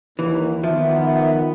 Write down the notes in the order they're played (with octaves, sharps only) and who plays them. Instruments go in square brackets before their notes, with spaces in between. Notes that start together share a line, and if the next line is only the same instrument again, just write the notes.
[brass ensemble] D#2 [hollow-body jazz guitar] E3
[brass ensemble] D#3 B3 [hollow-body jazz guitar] F3 [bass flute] E5